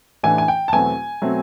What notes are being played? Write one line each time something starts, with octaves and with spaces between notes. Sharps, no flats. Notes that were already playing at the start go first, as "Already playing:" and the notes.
A1 A2 E3 A3 D4 G#5
G#5
G5
A5
E2 B2 F#3 A3 C4 G#5
B2 F#3 A3 C4